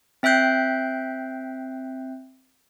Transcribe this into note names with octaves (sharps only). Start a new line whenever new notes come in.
C4 E5 G5 F#6 G6 C7